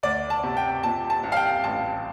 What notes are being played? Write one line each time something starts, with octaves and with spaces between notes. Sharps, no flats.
D2 D5
A5
C3
G5
A#2 A5
A5
C2
F5
G5
A1 A5